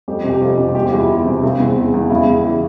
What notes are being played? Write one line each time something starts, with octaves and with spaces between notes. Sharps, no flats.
F2 G4
C3
G4
F2 F4
C3 G4
E2 G4
F4
E2
E4
E3
C3
C#3 C4
E2
E2
E2
C#3 E4
E2
E3